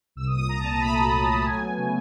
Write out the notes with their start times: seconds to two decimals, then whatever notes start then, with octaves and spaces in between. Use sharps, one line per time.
0.16 C2 E6
0.27 D#6
0.32 A#2
0.38 D#6
0.48 C2 A#5
0.59 A5
0.64 A#2
0.70 A#5
0.80 A3 B5
0.96 F#3 A#5
1.12 A#2
1.29 A3
1.45 F#3 G#5
1.61 B3
1.77 C#3